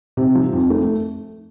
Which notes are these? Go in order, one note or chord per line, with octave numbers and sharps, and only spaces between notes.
C3
F3
F2
A3